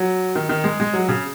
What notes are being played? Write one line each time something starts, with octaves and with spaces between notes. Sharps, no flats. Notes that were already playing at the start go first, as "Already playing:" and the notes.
Already playing: F#3
D#3
D#3
G#3
G#3
F#3
C#3